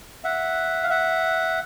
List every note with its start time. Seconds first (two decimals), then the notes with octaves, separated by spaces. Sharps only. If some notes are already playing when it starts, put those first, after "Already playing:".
0.24 E5 F#5
0.83 F5
0.90 E5 F#5